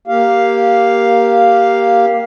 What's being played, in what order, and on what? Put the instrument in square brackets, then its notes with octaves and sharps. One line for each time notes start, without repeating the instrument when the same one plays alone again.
[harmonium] A#3 G4 F5